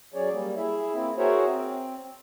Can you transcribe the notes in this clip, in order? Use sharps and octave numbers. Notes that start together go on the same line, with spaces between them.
F#3 C#4 G#4 C#5 D5
G3 A#3
E4 G#4 E5
A#3 C4 E4
F#4 G#4 A#4 C5 C#5 E5
C4